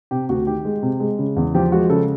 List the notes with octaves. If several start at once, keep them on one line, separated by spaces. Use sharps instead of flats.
C3 G4
D2 F#4
D#3 G4
G#3
C3
G#3
C#3
E2
F3 G4
G#3 F#4
C#3 A4